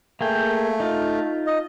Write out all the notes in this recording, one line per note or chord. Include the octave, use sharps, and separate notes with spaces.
A3 A#3 G#4 G5
D#4 F4
D#5